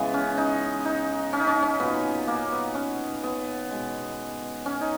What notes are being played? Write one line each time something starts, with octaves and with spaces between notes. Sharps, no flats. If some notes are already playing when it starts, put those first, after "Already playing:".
Already playing: C#3 E3 G#3 B3
C#4
D#4
D#4
C#4
D#4
C#4
D#4
C#4
A#2 F#3 B3
A#3
B3
C#4
B3
B2 G#3
C#4
D#4